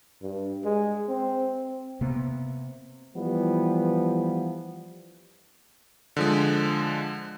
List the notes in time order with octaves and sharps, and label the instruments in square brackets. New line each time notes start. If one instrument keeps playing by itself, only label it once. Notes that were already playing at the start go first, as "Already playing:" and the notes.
[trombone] G2
G#3
C4
[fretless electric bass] C3 A#3 B3
[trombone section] E3 F3 G3 B3
[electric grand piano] D3 F3 G#3